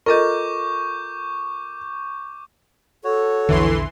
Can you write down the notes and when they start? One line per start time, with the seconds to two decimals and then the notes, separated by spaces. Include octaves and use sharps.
0.06 F4 A4 A#4 D#5 C#6 D6 G6
3.04 F#4 A4 C#5
3.49 A#1 E2 D3 E3 C6